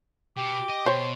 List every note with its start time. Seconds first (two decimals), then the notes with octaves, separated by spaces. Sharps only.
0.37 B2 G4 D6
0.70 D#5
0.86 B2 C5 C#5 C6